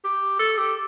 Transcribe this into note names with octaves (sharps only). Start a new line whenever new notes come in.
G4
A4
G4